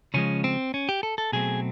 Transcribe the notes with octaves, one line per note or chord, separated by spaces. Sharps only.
C#3 F3 G#3 C#4
C4
C#4
G4
A4
A4
B2 F#3 A3 C4 G#4